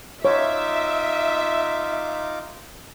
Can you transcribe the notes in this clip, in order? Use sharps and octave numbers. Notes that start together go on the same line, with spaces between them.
D#4 F4 C#5 E5 D6